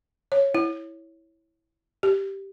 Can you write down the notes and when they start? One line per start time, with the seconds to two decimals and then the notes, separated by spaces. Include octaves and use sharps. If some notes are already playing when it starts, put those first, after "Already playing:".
0.32 C#5
0.55 E4
2.03 G4